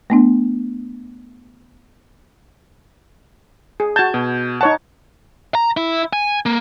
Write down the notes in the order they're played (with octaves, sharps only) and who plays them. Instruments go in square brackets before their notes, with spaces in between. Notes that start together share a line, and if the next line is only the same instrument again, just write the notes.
[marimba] A3 B3 D4
[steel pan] G#4
[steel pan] F#4 A5 [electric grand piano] G6 G#6
[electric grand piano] B2
[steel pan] D#4 C#5 F#5 [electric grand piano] A5
[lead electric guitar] A#5
E4
G#5
A#3